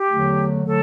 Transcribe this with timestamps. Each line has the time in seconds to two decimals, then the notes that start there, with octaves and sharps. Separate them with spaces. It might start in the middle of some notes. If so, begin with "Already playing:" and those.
Already playing: G4
0.08 E2 D3 F#3 A3
0.65 D3 F#3 A3 A4